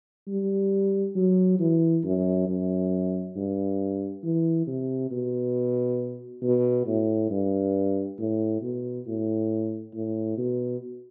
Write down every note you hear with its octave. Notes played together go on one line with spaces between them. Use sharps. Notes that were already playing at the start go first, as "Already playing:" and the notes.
G3
F#3
E3
F#2
F#2
G2
E3
C3
B2
B2
A2
G2
A2
B2
A2
A2
B2